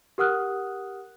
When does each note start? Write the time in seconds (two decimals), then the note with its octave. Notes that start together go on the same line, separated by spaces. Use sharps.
0.18 G4 A#4 F#5 D#6 F6 F#6